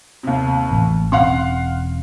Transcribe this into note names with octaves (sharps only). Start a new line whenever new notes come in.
D#2 C3
A1
E1 C4 C#4 F5 F#5 C6